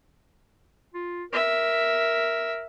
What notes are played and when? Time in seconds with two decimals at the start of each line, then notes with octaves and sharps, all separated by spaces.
0.94 F4
1.33 A#4 E5